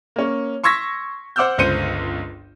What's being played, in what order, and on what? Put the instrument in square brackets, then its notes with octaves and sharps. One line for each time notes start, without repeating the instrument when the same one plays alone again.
[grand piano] A#3 C#4
C6 C#6 E6 G#6 A#6 B6
C5 F#5 D6 E6 F6 G6
G1 C#2 C5 C#7 D#7